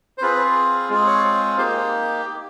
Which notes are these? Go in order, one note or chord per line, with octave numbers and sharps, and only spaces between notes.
C5
C4 F4 G#4 B4
G#3 C4 F4 G#4
C#5
A#3 D#4 G4 C5